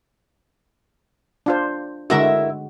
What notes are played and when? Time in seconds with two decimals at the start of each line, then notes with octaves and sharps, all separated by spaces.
1.46 D4 F4 C5
2.10 D3 G#3 E4 F#4 A#4 E5